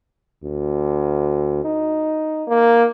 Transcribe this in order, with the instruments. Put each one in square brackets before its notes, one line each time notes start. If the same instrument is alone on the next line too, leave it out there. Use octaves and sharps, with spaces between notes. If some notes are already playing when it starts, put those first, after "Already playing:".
[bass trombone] D2
D#4
[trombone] A#3